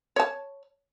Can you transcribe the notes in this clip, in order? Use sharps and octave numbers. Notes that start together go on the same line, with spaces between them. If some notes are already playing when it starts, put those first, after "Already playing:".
C#5 A5